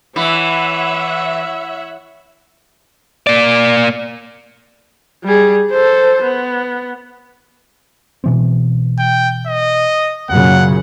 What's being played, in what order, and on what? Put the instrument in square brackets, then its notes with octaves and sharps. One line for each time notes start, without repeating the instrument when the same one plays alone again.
[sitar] E3 [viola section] C#5 E5 F#5
[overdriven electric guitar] A#3 D5
[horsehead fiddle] G3 G#4
A4 C5
B3
[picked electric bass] B2 E3 C4
[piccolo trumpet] G5
D#5
[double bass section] F#2 A#2 C#3 [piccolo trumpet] F#5